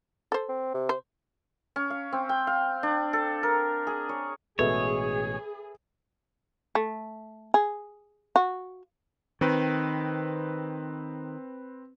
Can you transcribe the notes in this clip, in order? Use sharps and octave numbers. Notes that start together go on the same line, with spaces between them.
A4 C5
C4
C3
C5
C#4
F5
C4
G5
F5
D4
A4
A#4
G#4
C#5
A1 B2 G#3 G#4 A4 B4 C#5 E5
A3
G#4
F#4
D#3 C4 B4